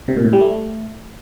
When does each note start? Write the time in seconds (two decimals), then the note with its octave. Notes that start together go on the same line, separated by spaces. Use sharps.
0.08 C3
0.16 A#2
0.25 A2
0.33 G3
0.41 A3